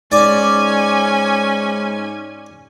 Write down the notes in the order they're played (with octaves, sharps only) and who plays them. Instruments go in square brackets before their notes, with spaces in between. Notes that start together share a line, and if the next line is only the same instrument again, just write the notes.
[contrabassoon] G#2 [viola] C#4 G#5 [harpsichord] D5